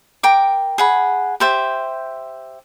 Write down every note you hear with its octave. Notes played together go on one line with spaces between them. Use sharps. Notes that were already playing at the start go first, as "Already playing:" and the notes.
A#4 G5 D6
G#4 F#5 B5
G4 C5 E5